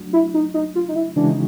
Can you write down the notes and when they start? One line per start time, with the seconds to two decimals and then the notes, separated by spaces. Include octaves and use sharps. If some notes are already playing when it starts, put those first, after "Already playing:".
Already playing: F#3 A3 D4 F#4
0.13 E4
0.34 D#4
0.54 D#4
0.76 F4
0.89 D#4
0.96 E4
1.16 C#3 E3 G#3 C#4 D4 F#4
1.28 D#4